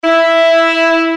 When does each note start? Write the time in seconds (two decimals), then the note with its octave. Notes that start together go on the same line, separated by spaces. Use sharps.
0.04 E4